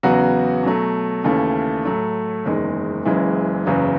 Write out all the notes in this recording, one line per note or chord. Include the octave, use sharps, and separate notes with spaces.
E2 C#3 F#3 B3 F#4
B2 F#3 A3
D#2 C#3 E3 A3 C#4
A2 F#3 A3
F#1 E2 D#3 G#3
F#1 F#2 C#3 E3 G#3
F#1 E2 C#3 F#3 B3